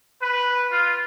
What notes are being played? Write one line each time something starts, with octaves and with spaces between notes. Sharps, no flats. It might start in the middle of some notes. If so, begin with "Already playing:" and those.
B4
F4